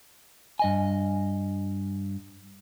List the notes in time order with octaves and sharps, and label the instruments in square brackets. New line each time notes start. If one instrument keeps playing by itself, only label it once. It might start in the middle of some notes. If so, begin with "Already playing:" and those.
[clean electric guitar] G2 D#5 G#5